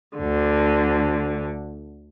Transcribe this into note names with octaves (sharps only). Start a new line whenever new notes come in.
D2 D3